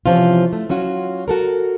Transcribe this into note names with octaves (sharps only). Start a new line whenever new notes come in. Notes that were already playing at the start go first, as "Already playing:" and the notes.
C3 E3 F3 C#4 F4
A3
F#3 C#4 F4 F#4
F#4 A4 A#4